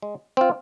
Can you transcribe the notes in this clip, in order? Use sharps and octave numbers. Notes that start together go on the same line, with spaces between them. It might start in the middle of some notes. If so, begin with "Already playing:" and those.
G#3
C4 F4